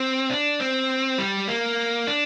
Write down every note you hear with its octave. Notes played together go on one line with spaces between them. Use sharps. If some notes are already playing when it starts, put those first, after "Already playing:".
Already playing: C4
D4
C4
G3
A#3
D4